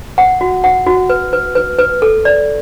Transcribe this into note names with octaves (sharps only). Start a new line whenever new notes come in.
F#5
F#4
F#5
F#4
B4
B4
B4
B4
A4
D5